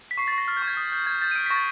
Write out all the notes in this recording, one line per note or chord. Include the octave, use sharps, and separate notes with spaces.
B6
C#6 C7
A6
C#6
A#6
F6 A6
G6
C#6
G#6
D#6
G6
G6 G#6
G6 A6
D#7
F6 D7
B6
C#6 A#6
A6